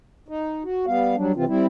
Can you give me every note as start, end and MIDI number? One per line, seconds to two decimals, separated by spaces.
0.28 0.63 63
0.64 0.86 66
0.87 1.16 55
0.87 1.16 59
0.87 1.16 77
1.16 1.32 54
1.16 1.32 55
1.16 1.32 62
1.36 1.45 48
1.36 1.45 52
1.36 1.45 60
1.36 1.45 65
1.48 1.66 55
1.48 1.66 60
1.48 1.66 64